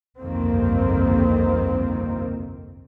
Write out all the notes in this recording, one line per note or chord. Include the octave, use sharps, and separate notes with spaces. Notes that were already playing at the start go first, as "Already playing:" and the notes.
G1 C2 F2 D#3 A#3 C4